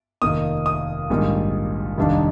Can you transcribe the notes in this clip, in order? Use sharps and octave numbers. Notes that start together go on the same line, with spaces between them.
F1 D#2 D#3 A#3 D#6
D#6
A#1 G#2 D#3 G3 A#3
F1 D#2 D#3 G3 D4